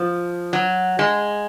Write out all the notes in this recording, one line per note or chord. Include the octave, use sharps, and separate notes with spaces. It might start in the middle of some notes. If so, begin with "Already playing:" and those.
Already playing: F3
F#3
G#3